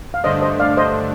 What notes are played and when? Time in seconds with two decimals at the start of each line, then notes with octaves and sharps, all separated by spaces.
0.14 F5
0.23 G2 D3 A3 D4 C5 D#5
0.42 C5 D#5
0.59 D5 F5
0.77 C5 D#5